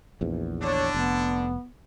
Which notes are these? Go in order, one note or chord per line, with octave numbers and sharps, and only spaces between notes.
A#1 E2
D3 D4 C#5
F1 B3